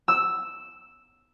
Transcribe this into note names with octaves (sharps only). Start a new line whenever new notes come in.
E6